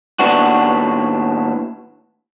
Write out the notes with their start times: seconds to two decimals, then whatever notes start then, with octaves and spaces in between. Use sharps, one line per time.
0.19 D#2 A2 B3 D4 F#4